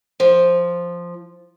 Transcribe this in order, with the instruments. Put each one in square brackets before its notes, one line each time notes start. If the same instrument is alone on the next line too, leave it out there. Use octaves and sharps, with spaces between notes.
[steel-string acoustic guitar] F3